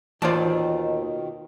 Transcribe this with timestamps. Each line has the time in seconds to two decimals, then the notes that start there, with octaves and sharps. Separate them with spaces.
0.22 D#2 B2 D#3 E3 F4 C5 D5 A5